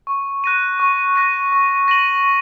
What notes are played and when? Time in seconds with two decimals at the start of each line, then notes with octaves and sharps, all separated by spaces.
0.07 C#6
0.44 F#6 A#6 D#7
0.80 C#6
1.16 F#6 A#6 D#7
1.52 C#6
1.88 A#6 D#7 F#7
2.24 C#6